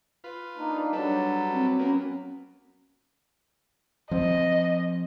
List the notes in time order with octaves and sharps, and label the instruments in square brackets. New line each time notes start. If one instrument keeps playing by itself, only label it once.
[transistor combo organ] F4 B4
[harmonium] A#3 D4 D#4
[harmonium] F#3 [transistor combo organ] G3 A4 B4 [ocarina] D4
[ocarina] C4
[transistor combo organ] A#3 B3 [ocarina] C#4
[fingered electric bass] F3 C4 [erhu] D#5